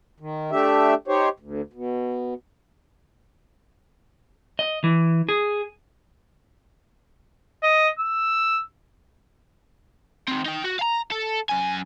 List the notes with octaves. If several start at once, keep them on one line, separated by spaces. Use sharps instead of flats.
D#3
A3 D4 G4 E5
D#4 G4 C5 C#5
D2
B2
D#5
E3
G#4
D#5
E6
D#3 C4
D#4 G5
F#4
F5 A#5
A4
F#2 G#5